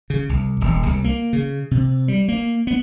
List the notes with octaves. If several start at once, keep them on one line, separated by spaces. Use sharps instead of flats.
C#3
C2
D#1
C2
A#3
C#3
C3
G3
A#3
B3